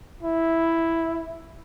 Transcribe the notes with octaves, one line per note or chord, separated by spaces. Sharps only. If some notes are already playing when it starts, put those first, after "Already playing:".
E4